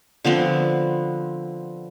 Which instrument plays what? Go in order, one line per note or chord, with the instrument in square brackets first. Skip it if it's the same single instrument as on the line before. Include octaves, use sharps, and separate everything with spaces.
[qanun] D3 F3 B3 C4